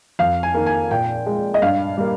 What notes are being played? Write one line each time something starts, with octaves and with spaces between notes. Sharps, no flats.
F2 F5
G#5
D#3 A#3
G#5
A#2 G5
G#3
D#5
G2 F5
G3 A#3